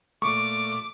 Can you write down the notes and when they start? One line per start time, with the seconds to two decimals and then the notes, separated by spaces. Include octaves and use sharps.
0.22 A#2 A3 C#6 D6